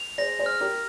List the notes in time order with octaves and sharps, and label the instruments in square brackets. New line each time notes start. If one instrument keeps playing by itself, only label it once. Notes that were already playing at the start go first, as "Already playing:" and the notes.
Already playing: [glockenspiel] F7
[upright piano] G#4 C5 [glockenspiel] A#6
[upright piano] G#4 C5
[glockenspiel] F6
[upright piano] G4 A#4